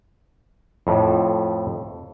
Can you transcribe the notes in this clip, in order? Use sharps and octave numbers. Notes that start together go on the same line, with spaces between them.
F2 A2